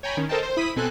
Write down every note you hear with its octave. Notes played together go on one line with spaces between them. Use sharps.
C#5 G5 G#5 A#5 B5
D#3 C#4
A4 A#4 C5 D#5 G5 A5
C5
E4 B5 D#6 B6 D#7
B2 C4 A4 G#5 F#6